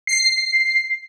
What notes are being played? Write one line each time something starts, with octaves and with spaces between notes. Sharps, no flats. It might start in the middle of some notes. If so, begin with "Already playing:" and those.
C7